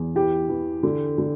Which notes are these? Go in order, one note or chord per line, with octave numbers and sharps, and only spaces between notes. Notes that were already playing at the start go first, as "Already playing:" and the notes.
Already playing: E2
E3 G4
E3
D3
D3